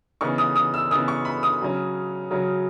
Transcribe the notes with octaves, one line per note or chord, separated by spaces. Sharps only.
C#3 E3 B3 D#4 C#6
D#6
D#6
E6
C#3 E3 B3 D#4 D#6
C#6
B5
D#6
C#3 F#3 C#4
C#3 F#3 C#4